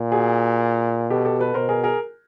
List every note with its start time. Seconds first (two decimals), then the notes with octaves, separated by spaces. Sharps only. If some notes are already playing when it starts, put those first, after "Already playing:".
Already playing: A#2
0.12 F#4 G#4
1.10 B2 G4 A4
1.25 G4 A4
1.39 A4 B4
1.54 B2 A#4 C5
1.69 G#4 A#4
1.83 G#4 A#4